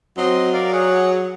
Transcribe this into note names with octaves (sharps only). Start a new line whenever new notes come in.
F#3 C4 D#5 C6
A#4 D5 F5
G#4 C#5 F#5